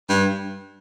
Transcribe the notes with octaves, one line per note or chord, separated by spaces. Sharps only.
G2